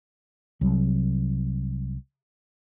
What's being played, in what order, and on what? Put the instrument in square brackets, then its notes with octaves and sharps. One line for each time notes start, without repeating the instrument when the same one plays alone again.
[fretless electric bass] C2 F#3